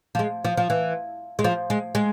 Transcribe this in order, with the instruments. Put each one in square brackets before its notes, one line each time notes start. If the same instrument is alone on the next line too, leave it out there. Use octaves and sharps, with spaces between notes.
[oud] F3
G#3
F3
F3
E3
G#3
F3
G#3
G#3